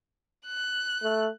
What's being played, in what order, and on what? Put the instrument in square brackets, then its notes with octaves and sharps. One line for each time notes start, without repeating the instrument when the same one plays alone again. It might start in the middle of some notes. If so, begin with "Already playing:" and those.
[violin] F#6
[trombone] A3